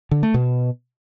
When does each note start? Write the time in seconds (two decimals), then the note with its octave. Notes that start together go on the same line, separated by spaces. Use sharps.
0.11 D3
0.23 A3
0.34 B2